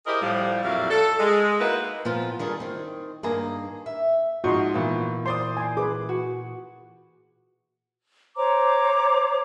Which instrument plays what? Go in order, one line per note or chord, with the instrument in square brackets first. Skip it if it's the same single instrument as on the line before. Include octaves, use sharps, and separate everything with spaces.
[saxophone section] E4 G4 G#4 A#4 C5 D#5
A2 F3 G3
F2 A#2 F#3 E4 D5 F5
A4
G#3
A#3 D#4 E4 F#4 B4
[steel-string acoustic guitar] A#2 F3 B3 F4
D#3 G3 G#4 A4
D#3 C4
G2 D#3 A#3 G#4 A#5
E5
[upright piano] G#2 F3 [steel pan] F#4 D#5 C6 [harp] C#6
[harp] A#2 E3 B3
[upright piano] C5 D5 D#6 [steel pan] C6
[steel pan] G#5 C6
[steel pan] G#4 B4 B5 [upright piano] D6
[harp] F#4
[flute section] C5 C#5 A#5 D6